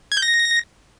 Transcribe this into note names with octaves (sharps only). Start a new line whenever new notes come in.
G#6
G6
A#6